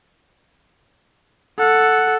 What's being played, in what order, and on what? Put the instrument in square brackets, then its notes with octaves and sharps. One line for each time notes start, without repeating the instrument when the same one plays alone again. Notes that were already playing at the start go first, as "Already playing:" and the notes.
[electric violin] A4 [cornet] F#5